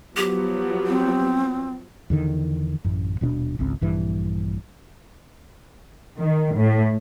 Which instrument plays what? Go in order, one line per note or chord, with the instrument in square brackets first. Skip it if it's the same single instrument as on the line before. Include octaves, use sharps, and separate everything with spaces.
[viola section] F3 F#3 B3 [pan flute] G4
[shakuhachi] C4
[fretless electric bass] E2 D3 D#3
A1 F#2
D#1 B2 C#4 D4
G#1 C#2 C4
A#1 G2 E3
[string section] D#3
A2